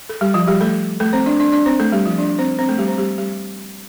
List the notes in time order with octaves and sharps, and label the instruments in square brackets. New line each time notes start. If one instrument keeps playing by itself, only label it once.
[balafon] A4
G3 G4
F3 F4
G3 G4
A3 A4
A3 A4
C4 C5
D4 D5
D4 D5
D4 D5
C4 C5
A3 A4
G3 G4
F3 F4
D4 D5
C4 C5
C4 C5
A3 A4
G3 G4
C4 C5
G3 G4
G3 G4